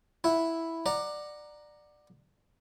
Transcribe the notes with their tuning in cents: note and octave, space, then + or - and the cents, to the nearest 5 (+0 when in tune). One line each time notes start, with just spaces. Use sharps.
E4 +0 F#5 +0
D5 +20 F#5 +0 A#5 +0